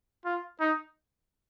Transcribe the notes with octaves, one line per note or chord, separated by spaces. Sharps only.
F4
D#4